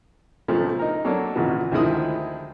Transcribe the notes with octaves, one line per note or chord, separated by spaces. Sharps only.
B1 A#2 C#3 F3 A3
D#4 A#4
F#3 A#3 D4 A4 C#5
G#1 A#2 C#3 E3 F#4
D2 D#3 F3 G#3 E4 D#6